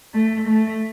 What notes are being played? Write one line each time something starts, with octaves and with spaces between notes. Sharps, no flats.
A3
A3